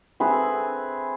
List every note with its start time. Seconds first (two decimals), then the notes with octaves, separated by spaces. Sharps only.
0.20 C4 G#4 B4 E5